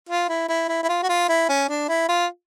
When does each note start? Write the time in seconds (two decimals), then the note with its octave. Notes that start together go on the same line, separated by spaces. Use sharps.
0.09 F4
0.29 E4
0.49 E4
0.69 E4
0.83 E4
0.89 F4
1.03 F#4
1.09 F4
1.29 E4
1.49 C#4
1.69 D4
1.89 E4
2.08 F4